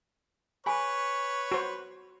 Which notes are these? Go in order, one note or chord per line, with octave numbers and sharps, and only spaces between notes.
G#4 B4 C#5 G#5 B5 C#6 D6
F#4 C5